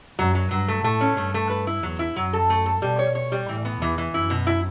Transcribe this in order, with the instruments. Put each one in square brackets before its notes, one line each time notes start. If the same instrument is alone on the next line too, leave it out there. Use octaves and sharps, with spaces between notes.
[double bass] F#2 [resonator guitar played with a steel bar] F#3
[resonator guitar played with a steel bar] F#3
[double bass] G2 [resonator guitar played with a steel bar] F#3
[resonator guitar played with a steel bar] A3
[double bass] A2 [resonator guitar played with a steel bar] A3
[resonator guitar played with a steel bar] C#4
[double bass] G2 [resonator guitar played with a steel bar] A3
[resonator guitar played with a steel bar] A3
B4
E4
[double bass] E2 [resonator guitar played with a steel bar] F#3
[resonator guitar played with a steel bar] E4
[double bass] F#2 [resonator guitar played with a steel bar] F#3
[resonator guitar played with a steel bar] A4
A3
A4
[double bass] B2 [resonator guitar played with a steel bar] G3
[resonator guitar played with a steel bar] C#5
C#5
G3
[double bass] A2 [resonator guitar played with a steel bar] E3
[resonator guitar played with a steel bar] B3
[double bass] E2 [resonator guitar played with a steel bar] E3
[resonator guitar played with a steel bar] E3
[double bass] F#2 [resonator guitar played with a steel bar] E4
[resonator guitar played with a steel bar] B2
E4